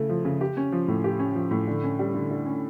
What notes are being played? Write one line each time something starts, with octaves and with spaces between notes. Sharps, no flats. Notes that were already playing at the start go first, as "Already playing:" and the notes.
Already playing: C#3 A3 E4
F3
C#3
G4
C#4
F3
A2
G4
C#4
F3
A2
D3
C#4
G3
D3
D3
C#4